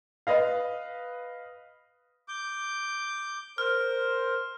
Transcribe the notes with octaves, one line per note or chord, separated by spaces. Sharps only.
B4 D#5 F5
D6 G6
A#4 C5 F6